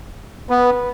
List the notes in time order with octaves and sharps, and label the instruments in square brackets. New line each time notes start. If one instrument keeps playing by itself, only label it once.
[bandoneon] B3 [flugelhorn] B4